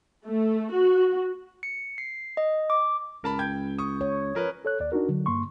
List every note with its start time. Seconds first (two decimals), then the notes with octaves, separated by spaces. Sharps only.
0.25 A3
0.72 F#4
1.63 C#7
1.98 C7
2.37 D#5
2.70 D6
3.24 C#2 A#4 A5 B5
3.39 G5 G6 G#6
3.78 C#6 D#6
4.01 C#5
4.35 F3 C#4 A#4 B4
4.65 A4 C#5 F#6
4.80 D#2 D5
4.92 D4 D#4 F#4 A#4
5.09 D3 F#3
5.26 G2 A#3 C6 C#6